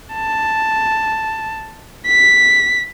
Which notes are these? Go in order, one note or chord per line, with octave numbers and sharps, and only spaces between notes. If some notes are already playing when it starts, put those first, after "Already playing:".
A5
B6